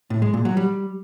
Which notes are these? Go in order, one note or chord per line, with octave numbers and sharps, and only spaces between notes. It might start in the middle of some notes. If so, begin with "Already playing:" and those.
A2
G#3
A#2
F#3
G3